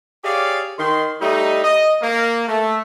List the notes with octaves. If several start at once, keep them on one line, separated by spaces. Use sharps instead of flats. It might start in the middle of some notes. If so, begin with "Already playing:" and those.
G4 G#4 C#5 D5 F5
D#3 C6
G3 A3 D#4
D#5
A#3
A3